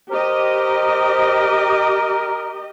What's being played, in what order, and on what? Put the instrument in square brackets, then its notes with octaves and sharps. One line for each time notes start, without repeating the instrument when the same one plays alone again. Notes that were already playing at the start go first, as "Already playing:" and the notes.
[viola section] G4 D#5 [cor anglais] A#4 [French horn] C5